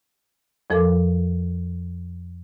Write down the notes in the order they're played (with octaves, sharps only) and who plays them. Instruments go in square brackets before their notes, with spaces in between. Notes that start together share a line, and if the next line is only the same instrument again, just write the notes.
[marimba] F2 F3 A4 A#4 D6